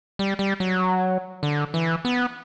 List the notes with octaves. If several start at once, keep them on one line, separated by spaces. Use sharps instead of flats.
G3
G3
F#3
D3
E3
B3